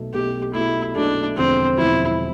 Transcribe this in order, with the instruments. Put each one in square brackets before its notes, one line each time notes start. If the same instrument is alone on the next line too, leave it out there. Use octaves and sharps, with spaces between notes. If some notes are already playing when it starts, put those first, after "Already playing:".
Already playing: [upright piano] B1 B2 A3
[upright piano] B1 B2 A3 [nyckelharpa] G4
[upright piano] B1 B2 A3 [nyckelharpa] E4
[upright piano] B1 B2 A3 [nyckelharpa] D4
[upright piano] E1 E2 D3 F3 [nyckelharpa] C4
[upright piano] E1 E2 D3 F3 [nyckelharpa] E4